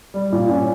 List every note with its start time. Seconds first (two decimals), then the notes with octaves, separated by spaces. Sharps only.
0.14 G3
0.32 A#2
0.49 C#4